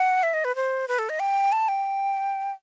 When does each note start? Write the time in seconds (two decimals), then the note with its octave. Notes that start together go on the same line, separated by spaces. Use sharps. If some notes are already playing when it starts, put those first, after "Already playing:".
Already playing: F#5
0.23 E5
0.34 D#5
0.44 B4
0.55 C5
0.88 B4
0.99 A4
1.09 D#5
1.20 G5
1.52 A5
1.68 G5